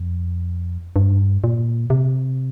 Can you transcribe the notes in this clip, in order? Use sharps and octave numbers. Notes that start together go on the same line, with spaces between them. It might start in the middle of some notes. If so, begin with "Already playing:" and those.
Already playing: F2
G2
A#2
C3